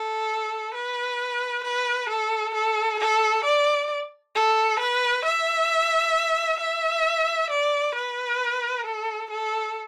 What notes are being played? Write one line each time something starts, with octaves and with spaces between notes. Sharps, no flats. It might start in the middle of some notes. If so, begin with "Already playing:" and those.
Already playing: A4
B4
B4
A4
A4
A4
D5
A4
B4
E5
E5
D5
B4
A4
A4